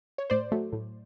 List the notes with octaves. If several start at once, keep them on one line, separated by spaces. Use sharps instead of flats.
C#5
A2 C5 D5
F#3 A3
A2